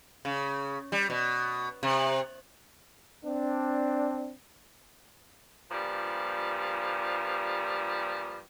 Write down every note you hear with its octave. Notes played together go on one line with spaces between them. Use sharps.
C#3
G3
B2
C3
C4 D4
G2 A#2 F3 G3